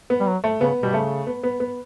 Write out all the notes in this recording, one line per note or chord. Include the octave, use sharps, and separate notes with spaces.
B3
G3
F#3
A3
C#3 B3
B2 G3
C#3 A3
B3
B3
B3